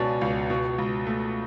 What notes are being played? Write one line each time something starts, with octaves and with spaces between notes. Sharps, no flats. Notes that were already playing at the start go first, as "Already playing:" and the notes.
Already playing: C#2 B2 C#4 D5 F5 G#5 A5
C#2
B2
C#2
A3